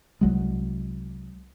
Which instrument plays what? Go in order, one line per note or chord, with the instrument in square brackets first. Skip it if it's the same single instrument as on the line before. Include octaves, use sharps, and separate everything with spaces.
[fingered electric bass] C2 F#3 G#3